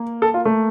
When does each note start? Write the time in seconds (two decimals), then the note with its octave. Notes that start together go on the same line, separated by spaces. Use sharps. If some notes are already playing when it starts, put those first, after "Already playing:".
Already playing: A#3
0.22 A4
0.34 F4
0.45 A3